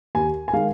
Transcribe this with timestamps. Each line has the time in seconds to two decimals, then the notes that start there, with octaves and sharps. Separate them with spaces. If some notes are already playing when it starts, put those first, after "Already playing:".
0.15 D#2 G#5
0.48 G#5
0.53 D#3 G#3 F5